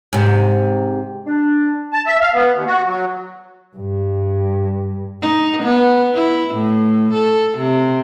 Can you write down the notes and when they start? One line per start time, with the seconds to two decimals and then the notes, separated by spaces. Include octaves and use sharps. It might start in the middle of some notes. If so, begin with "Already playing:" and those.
0.13 G#2 C3
1.27 D4
1.93 A5
2.07 E5
2.21 F5
2.34 B3
2.53 D#2
2.67 F#4
2.86 F#3
3.77 G2
5.22 D#4
5.63 B3
6.15 E4
6.55 A2
7.14 A4
7.58 C3